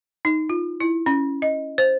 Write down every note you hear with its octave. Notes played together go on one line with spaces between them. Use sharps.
D#4
F4
E4
C#4
D#5
C5